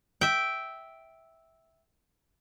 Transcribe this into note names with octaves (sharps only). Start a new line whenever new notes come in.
E5 G5